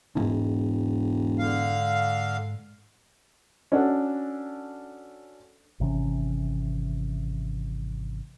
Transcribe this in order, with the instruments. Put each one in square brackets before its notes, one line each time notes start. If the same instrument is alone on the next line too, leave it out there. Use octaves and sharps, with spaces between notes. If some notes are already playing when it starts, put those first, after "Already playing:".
[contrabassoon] E1 [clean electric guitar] B1 G#2
[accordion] D3 F5
[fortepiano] C#4 D4 F#4 A4
[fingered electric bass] G#1 C3 E3 C#4